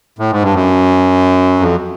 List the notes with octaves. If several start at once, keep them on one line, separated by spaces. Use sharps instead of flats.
A2
G#2
G2
F#2
F2